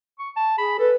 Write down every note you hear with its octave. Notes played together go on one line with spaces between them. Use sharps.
C#6
A5
G#4 B5
A4 B4